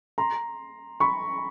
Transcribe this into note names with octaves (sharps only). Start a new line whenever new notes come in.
A#5 C6
B5 C#6